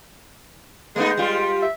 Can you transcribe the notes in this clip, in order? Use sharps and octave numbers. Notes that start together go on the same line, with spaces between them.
G#3 A3 B3 D#4
G3 F4
E5